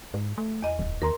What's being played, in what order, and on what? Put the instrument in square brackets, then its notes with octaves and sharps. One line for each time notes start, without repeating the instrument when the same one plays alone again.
[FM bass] G#2
A3
[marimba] E2 D#5
[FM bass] D1
[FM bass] D#2 [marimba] A#4 A#5 C6